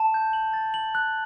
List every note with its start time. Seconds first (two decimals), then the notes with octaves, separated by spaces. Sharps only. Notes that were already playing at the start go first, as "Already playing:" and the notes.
Already playing: A5
0.14 G6
0.33 F#7
0.53 A6
0.74 F#7
0.95 F#6